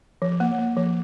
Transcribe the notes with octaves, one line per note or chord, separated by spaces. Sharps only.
F3
A#3
A#3
F3